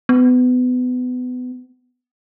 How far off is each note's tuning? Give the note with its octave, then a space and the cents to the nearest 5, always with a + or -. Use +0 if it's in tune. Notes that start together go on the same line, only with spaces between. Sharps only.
B3 +25